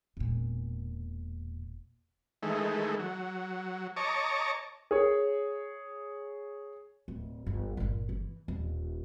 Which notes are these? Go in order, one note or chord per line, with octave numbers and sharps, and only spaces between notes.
E1 A#2
D#3 E3 G#3 A3
F#3
C#5 D#5 A5 A#5 C#6 D6
G#4 C#5
D1
G1
G1 A#2
E3
D#1